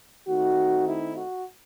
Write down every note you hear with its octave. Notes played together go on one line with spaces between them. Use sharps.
D#3 A3 C4 D#4 F#4
E4
F#4